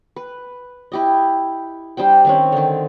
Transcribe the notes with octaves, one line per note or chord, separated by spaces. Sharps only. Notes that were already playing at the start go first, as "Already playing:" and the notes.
B4
E4 G4 D#5
G3 D4 C5 G5
D#3 C4 C#4
D3 D#3